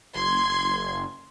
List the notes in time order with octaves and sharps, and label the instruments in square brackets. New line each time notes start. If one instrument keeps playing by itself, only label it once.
[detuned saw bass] F#1 [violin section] C6 G#6